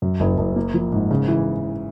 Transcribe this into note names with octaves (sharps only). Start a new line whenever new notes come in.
F#2
F#1
F#1
A#3
F3
G#2
C#3
E3